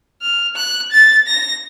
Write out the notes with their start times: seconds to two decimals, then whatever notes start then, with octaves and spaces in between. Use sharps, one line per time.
0.22 F6
0.56 F#6
0.92 A6
1.27 A#6